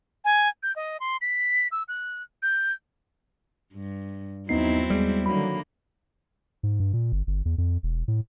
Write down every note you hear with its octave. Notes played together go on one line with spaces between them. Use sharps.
G#5
G6
D#5
C6
B6
E6
F#6
G6
G2
D#2 F#3 B3 C4 D#4 E4 C7
G3 G#3
D3 D#3 F#3 A#3 B5
G#2
G2
A#2
G1
G1
E2
F2
E1
A2